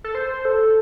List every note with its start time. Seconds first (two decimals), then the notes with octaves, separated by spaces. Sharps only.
0.04 A4
0.15 C5
0.45 A4